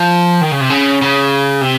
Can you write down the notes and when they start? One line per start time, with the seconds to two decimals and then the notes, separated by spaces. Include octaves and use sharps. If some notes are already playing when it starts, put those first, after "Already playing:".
Already playing: F3
0.41 D#3
0.51 C#3
0.60 C3
0.70 C#3
1.02 C#3
1.61 C3